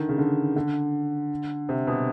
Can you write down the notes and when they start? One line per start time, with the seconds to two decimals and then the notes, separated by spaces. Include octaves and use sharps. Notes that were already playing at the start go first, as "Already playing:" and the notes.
Already playing: D3 D#3
0.09 C#3
0.18 D3
0.56 D3
1.69 C3
1.87 B2